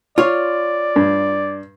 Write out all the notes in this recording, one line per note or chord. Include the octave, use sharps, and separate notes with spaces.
F4 C#5 D5
G2